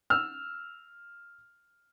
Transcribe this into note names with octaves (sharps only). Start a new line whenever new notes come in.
E6 F6